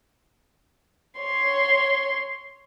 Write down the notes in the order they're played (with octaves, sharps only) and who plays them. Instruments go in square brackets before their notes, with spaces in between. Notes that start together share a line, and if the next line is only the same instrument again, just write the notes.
[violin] C#5 C6